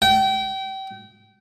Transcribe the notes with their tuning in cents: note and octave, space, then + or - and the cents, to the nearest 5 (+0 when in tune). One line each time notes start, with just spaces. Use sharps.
G5 -30